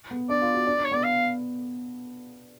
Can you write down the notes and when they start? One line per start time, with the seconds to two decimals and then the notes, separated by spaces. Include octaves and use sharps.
0.11 B3
0.29 D4 D5
0.42 F4
0.54 F#4
0.66 D4
0.78 D4
0.84 C#5
0.91 B3 D5
1.04 F5